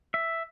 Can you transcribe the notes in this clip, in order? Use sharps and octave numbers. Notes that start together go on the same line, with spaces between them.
E5